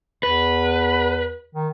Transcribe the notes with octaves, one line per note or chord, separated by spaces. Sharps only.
E2 B4
D#3